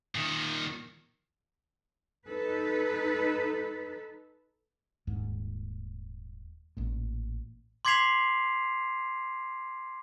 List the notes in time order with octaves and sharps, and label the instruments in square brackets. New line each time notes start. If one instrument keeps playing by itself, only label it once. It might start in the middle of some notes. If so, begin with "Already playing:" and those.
[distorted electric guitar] A#2 D#3
[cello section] D#4 A4 B4
[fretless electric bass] D#1 D#2 G#2
A1 A#2
[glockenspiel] C6 D6 G#6 B6 C7 F7